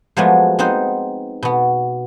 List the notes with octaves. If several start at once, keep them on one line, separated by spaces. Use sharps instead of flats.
F3 F#3 G#3 A3 B3
B3 C4 D#4 C5 F#5
B2 B3